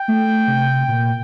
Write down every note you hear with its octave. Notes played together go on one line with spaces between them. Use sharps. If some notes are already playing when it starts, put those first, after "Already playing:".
Already playing: G5
A3
C3
A#2